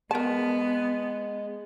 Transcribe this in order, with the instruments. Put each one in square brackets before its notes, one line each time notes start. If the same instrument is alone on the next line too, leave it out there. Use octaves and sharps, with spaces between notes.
[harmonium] G#3 [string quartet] B3 [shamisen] A#4 A5